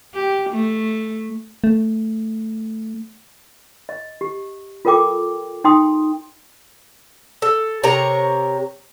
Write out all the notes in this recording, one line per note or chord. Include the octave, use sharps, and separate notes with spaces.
G4
A3
A3
D#5
G4
F4 A4 A#4 G5 D6
D#4 G5 C6 D#6
A4
C3 A#4 C#5 A#5